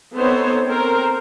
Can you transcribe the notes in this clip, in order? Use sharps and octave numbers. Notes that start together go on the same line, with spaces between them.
B3 C4 D#4 A4 C5 C#5
C4 A4 A#4 C5